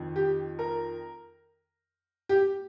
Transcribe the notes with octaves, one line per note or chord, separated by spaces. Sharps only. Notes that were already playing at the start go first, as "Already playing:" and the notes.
Already playing: F2 D#3
G4
A#4
G4